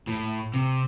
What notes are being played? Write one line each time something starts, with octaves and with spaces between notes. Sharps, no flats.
A2
C3